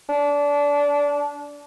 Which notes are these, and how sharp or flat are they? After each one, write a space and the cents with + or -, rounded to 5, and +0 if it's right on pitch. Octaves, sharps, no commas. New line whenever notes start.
D4 -25